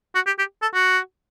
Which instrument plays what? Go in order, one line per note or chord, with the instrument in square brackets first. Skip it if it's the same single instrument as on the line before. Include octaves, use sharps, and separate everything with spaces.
[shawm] F#4
G4
G4
A4
F#4